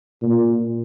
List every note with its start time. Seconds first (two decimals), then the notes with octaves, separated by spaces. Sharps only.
0.22 A#2